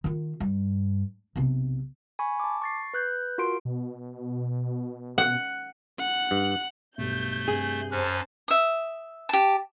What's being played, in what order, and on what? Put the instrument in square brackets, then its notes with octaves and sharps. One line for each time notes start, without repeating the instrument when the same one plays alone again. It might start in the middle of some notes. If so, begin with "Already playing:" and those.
[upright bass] D#3 F4
G2
B1 C3
[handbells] G#5 B5 C#6
A5 D6
C#6 A6 C7
B4 F#6 G6
F4 F#4 A#4 C6 D7
[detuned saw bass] B2
[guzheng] F#5
[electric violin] F#5 F#6
[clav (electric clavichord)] G2
[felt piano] B1 G2 [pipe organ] A3 [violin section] G6
[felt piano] G2 C3 [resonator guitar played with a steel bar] G#4
[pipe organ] F#2 C#4 F#6 [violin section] C5 A5
[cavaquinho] E5 D#6
G4 A5